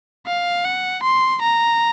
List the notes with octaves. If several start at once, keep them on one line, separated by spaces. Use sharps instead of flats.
F5
F#5
C6
A#5